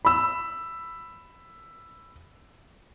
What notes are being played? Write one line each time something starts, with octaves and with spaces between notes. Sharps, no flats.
B5 E6